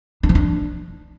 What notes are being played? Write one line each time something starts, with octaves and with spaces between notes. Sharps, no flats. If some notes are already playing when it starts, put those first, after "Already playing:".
D4
F3
D4